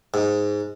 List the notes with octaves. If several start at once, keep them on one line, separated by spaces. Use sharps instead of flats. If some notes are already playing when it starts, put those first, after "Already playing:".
G#2